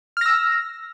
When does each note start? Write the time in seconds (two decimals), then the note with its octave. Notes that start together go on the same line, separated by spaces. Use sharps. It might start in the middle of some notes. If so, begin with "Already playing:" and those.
0.17 F6
0.21 A#6
0.26 E6